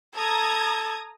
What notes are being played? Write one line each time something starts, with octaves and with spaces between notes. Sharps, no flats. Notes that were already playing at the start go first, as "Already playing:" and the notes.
A4 A#5 D#6 G#6